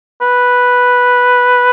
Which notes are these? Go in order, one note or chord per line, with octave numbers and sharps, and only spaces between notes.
B4